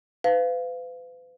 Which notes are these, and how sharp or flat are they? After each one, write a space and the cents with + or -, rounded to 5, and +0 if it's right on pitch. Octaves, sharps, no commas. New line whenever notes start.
B4 +40 F5 -5